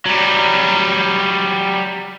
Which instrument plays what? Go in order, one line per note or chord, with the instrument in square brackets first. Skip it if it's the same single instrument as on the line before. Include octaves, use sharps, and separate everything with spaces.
[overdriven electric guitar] F#3 G3